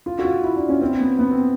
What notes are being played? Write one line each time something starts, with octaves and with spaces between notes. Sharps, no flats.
F4
F#4
F4
E4
D4
C#4
C4
B3
B3
C4